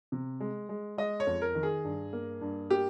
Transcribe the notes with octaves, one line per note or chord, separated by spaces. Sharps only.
C3
G#3
G#3
G#3 D#5
C#5
F2
A#4
D#3
G#4
G2
A#3
G2
A#3 G4